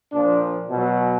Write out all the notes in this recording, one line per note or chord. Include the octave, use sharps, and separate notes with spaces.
A#2 F3 D4
B2 F#3